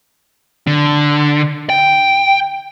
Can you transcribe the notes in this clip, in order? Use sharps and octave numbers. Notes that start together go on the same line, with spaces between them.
D3
G5